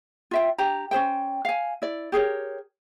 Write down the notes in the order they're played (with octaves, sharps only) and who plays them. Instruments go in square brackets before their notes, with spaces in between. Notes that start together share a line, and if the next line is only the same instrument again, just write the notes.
[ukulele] F4 E5 G5
D4 G4 A#5
C#4 G#4 C5 G5
F5 G#5
E4 D5
G4 G#4 A#4 C#5